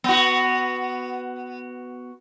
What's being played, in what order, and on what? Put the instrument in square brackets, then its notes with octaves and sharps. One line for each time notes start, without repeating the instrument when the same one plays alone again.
[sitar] B3 F#4